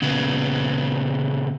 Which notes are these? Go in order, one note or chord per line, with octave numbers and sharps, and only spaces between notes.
A#2 C#3 B3